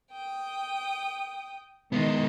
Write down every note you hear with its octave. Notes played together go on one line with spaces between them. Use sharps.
G5 D#6
D#3 G#3 B3 D#5